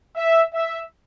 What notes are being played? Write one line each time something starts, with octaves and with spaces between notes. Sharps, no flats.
E5
E5